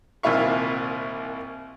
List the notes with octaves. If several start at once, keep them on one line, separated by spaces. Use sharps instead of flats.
C2 A#2 D#3 E4 F5 C#6